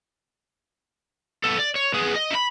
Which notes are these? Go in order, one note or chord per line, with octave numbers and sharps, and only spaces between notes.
B3 A4
D5
C#5
B3 G#4
D#5
E4 B5